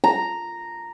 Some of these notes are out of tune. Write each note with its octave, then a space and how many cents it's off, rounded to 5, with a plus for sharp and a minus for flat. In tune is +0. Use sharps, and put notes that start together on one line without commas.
A#5 -5